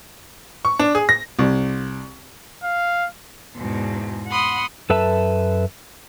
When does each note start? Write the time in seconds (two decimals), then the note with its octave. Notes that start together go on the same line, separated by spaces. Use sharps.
0.65 C#6
0.79 D4
0.95 G#4
1.09 A#6
1.39 C2
2.64 F5
3.58 E2 G#2 B2
4.29 F#5 B5 C6 D#6
4.90 F#2 A4 B4 E5 A5